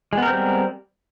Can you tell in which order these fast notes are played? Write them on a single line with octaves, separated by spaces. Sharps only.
G#3 B3 A#4 C4 G3